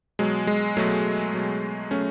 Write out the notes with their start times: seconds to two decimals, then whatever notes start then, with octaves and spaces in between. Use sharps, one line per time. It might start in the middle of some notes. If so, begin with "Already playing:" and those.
0.19 B2 F#3 G#3
0.47 G#3
0.77 B2 F#3 A3
1.34 B2 F#3
1.91 B2 F#3 A3 C#4